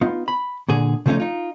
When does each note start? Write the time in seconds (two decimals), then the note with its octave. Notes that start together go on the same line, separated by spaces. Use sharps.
0.01 B3 D#4 F4
0.28 B5
0.68 A#2 D3 G#4
1.06 C#3 F3 A3 B3 C#4 D#4
1.20 D#4 F4